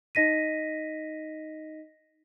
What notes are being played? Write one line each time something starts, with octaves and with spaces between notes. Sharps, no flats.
D#4 D#5 A#6 B6 D#7